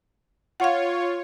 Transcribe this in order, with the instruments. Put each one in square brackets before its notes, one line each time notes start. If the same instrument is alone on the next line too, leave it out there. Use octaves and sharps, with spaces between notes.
[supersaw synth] F4 C#5 [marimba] F5 F#5